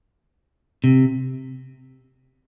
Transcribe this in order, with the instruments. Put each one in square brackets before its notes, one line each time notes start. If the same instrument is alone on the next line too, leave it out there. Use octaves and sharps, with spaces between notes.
[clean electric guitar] C3